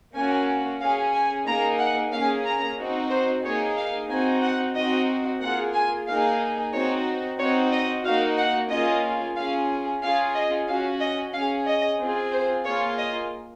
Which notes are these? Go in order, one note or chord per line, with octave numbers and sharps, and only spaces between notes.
A#3 C#4 F#4 G#5
C#4 G#4 F5
G#5
A#3 D#4 G#4 A#5
F#5
A#3 C#4 G#4 F5
A#5
C4 D#4 F#4
C5
A#3 D#4 G#4 C#5
F5
C4 D#4 F#4 G#5
F#5
C4 D#4 F#4 D#5
A#3 F4 G#4 F#5
G#5
A#3 D#4 G#4 F5
C4 D#4 F#4 C#5
C4 D#4 F#4 C#5
D#5
A#3 D#4 F#4 F5
F#5
A#3 C#4 F4 G#4 D#5
C#4 F4 G#4 F5
C#4 F4 G#4 F5
D#5
C#4 F#4 F5
D#5
C#4 G#4 F5
D#5
C4 F4 G#4
C5
A#3 F4 G#4 C#5
D#5